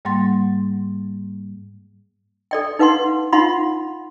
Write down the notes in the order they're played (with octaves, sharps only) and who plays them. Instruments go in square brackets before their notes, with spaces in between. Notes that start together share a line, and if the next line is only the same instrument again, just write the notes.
[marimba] G#2 G3 A#3 F#5 C6 A6
[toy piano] A4 D5 G5
D#4 B4 F5 F#5 C6
D#4 F4 F5 F#5 B5 C6